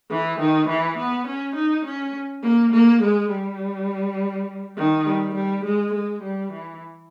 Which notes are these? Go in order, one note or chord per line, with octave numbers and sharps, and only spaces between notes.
E3
D#3
E3
B3
C#4
D#4
C#4
A#3
A#3
G#3
G3
D#3
G3
G3
G#3
G#3
G3
E3